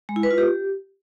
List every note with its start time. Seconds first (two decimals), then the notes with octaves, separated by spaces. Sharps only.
0.09 G#3
0.16 E4
0.23 B4
0.31 F4
0.38 G4